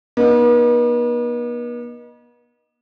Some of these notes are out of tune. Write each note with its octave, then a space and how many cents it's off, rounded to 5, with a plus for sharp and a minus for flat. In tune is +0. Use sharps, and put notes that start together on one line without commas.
B3 -45 D#4 -15